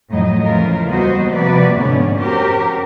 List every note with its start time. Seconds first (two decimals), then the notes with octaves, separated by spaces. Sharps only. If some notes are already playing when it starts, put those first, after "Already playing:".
0.10 F2 A2 F#3 D#4 D#5
0.44 C#3 E3 F3 A3 F4 A#4
0.88 D#2 G3 B3 F#4 C5 D#5
1.30 C3 F3 A#3 F#4 B4 D5
1.75 F2 G#2 D3 B3 C#4 D4
2.18 C#4 F#4 G4 A#4 C5